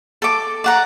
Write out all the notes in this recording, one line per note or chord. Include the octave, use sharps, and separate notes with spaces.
A4 D6
D5 F#5 A#5